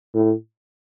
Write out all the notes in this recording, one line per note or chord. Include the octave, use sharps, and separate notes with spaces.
A2